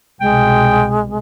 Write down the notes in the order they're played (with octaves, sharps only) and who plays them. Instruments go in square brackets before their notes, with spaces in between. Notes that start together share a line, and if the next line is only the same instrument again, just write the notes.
[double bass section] C2 B2 [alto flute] G#3 [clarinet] G5